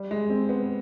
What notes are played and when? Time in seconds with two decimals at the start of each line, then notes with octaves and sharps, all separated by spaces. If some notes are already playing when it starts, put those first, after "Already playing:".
Already playing: G3
0.11 G#3
0.30 C4
0.49 B3